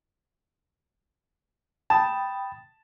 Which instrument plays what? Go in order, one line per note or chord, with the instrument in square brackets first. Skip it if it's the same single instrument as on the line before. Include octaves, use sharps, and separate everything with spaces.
[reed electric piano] G5 B5 D#6 [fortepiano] A5